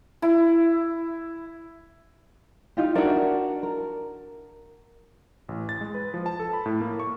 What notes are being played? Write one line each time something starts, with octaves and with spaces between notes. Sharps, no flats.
E4
D#4 F4 G4
D4 F#4 A#4 D5 E5
A#4
A1
A6
G#3
B4
F3
A5
A4
B5
A2
A#3
C#6